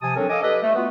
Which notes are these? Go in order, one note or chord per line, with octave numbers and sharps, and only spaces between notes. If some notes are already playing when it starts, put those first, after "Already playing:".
C3 F3 G#5 A5 D#6
F#3 C4 D4 A4 A#4 C#5
A4 D#5 F5 G#5 D6 D#6
G4 A4 B4 D5 D#5
A3
A3 B3 F4 F#4 B4